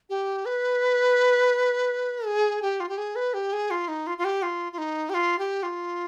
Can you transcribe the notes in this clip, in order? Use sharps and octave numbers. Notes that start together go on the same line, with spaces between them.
G4
B4
G#4
G4
F4
G4
G#4
B4
G4
G#4
F4
D#4
F4
F4
G4
F4
F4
D#4
G4
F4
G4
F4